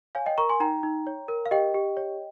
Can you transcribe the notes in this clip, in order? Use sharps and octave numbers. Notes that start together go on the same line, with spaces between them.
C#5 F5 G#5
D#5 G5
A#4 A#5 C#6
G#5 C6
D#4 G5 A#5
D#4
C#5
A#4
F5
G4 D#5 G5
G4
C#5